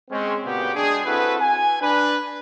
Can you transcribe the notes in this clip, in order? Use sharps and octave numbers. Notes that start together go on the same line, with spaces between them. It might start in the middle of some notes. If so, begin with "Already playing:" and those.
G#3 C4 C#4
A#2 C#3 B3 F#4 G4
G#3 D4 G#4
C4 E4 F#4 A4 B4
G#5
D4 B4